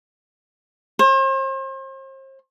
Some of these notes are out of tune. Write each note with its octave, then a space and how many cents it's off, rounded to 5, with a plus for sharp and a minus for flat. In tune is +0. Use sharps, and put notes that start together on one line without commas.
C5 +40